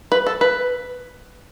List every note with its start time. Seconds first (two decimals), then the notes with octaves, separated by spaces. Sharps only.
0.12 B4
0.27 A4
0.41 B4